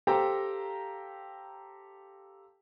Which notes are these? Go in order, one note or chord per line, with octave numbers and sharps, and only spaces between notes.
G4 A4 C5 F5 G5 A#5